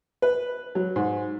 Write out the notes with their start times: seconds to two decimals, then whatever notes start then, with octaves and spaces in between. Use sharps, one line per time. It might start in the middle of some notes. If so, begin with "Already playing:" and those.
0.22 B4
0.75 F#3
0.96 G#2